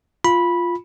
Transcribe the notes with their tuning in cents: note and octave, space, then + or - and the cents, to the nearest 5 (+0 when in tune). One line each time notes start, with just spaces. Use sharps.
F4 +0 B5 -10